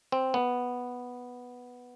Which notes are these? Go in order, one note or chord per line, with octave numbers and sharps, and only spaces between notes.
C4
B3